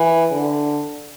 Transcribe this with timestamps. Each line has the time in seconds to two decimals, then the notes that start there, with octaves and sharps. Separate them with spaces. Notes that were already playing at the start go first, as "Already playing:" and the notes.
Already playing: E3
0.32 D3